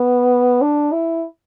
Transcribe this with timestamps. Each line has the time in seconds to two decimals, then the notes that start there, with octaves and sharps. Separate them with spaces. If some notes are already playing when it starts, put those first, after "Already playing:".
Already playing: B3
0.62 D4
0.92 E4